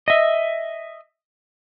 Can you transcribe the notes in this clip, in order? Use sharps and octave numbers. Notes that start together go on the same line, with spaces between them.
D#5 E5